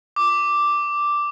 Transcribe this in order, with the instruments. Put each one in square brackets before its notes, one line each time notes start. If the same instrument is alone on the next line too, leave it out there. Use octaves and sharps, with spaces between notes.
[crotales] D6